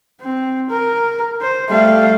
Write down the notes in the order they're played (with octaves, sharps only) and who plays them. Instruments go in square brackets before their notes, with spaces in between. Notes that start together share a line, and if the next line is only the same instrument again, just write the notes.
[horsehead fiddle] C4
A#4
C5
[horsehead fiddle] G3 F5 [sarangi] A3